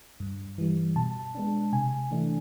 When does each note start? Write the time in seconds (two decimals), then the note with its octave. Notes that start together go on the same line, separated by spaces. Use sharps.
0.20 G2
0.58 E3 G3
0.96 B2 A5
1.35 G#3 B3 D4
1.73 C3 G#5
2.11 E3 A3 D4